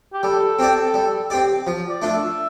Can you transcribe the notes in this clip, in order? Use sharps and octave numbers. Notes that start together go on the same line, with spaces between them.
G4
G3 A4
C4 G4 D5
G3
C4 G4 D5
F3
D5
A3 D4 F4
E5